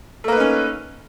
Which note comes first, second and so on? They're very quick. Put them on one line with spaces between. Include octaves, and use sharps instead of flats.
A3 A#3 B4 D#4 C#4